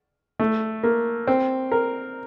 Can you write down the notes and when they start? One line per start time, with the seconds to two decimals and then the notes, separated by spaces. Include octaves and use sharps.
0.39 A3
0.83 A#3
1.27 C4
1.72 A#4